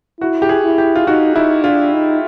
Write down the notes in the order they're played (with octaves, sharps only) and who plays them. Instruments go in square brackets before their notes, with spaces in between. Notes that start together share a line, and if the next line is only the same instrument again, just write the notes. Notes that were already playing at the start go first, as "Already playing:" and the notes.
[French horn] E4 [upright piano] F#4
[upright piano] G4
G#4
[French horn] E4
[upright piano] G4
F4
[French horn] D#4 [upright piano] F#4
[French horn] D#4 [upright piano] E4
[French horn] D4 [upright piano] F4
[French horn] D#4